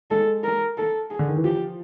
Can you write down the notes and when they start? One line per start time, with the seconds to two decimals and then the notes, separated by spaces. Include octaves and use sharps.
0.11 G#3 A4
0.44 A#4
0.78 A4
1.10 G#4
1.19 D3
1.28 D#3
1.36 E3
1.44 F3 G4